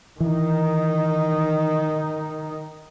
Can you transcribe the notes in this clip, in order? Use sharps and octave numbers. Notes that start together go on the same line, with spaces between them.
D#3 E3 D#4